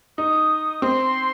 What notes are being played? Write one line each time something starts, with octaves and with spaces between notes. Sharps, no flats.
D#4 D#6
C4 C6